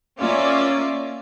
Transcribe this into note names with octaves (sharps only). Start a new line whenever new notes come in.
A#3 C#4 F4 D5 E5